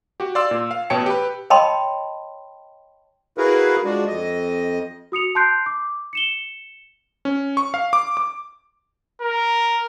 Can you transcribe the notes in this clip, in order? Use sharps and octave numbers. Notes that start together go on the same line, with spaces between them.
F#4 G4
D5 F5 C6 E6
A#2
F5
A1 B2 C#5 G5 A5 C#7
G4 B4
C#5 D#5 G5 A5 B5 C6
E4 F#4 G#4 A#4 B4 F5
F3 G#3 D4 F#4 D5
F2 D#5
F#4 D#6 C#7 F7
A5 C6 F#6 G6 C7 D7
D6
C#7 E7 G7
C#4
C#6
F5
D6
D6
A#4